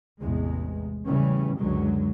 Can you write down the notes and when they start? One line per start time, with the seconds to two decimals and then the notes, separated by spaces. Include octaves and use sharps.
0.20 A1 E2 C3 G#3
1.04 A2 C#3 E3 G3 C#4
1.56 C#2 F#2 D3 F#3 G#3